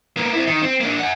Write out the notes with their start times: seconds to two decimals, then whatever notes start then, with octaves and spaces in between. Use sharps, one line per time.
0.17 A#3 B3
0.33 C4 E4
0.47 D#3
0.62 C4
0.81 A#3 D4
0.99 F#5 G#5